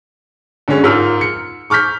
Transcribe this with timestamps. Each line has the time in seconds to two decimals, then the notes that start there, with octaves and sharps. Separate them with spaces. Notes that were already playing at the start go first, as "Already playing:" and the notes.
0.68 F#2 D3 G#3 C#4
0.84 G#2 F4 A#4 E6 F6
1.21 C#7
1.70 C#6 D6 F6 G6 B6